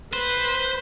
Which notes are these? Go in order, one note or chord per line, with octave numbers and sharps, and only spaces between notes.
B4 C5